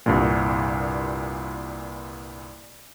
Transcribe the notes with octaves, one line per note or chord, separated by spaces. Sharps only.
C2 G2 A#2